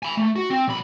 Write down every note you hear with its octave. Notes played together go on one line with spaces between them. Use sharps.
G#5 B5
A3
F#4
C4
B1 B5